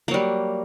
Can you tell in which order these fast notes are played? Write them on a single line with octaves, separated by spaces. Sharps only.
A#3 F#3 G3